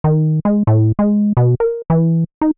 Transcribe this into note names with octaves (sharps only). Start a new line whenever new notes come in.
D#3
G#3
A2
G#3
B2
A#4
E3
D#4